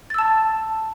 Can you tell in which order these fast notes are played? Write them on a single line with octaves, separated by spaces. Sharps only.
A6 E6 A5